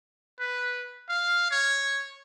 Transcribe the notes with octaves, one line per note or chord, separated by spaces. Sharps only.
B4
F5
C#5